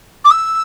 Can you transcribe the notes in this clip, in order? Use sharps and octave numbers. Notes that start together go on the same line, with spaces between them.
D6
E6